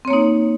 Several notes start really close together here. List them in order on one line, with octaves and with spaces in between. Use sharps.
C4 C#5 A#3 D#4